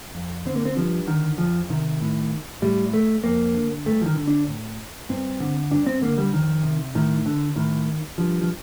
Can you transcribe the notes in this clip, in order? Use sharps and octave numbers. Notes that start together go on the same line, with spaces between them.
F2
D3 C4
A#3
C4
G2 F3
D3 D#3
F2 F3
C3 D#3
A2
A2 G3
A3
F2 A#3
D3
G2 A3
F3
D#3
D3
D4
A2
G2 C4
D3
G2 D4
C4
D3 A#3
G3
F2 D#3
C3
A2 D#3
D3
A2 D#3
G2 F3
F3